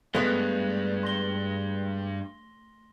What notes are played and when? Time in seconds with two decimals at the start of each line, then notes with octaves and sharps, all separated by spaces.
0.15 G2 G#3 A3 B3 F7
1.03 C6 A#6 G7